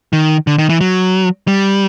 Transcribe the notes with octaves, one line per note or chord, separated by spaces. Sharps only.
D#3
D3
D#3
E3
F#3
G3